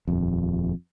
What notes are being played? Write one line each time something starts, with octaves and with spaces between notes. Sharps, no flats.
D#1 F2